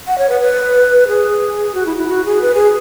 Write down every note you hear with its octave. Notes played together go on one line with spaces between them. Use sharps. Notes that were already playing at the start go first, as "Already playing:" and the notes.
F#5
C#5
B4
B4
G#4
F#4
E4
E4
F#4
G#4
B4
G#4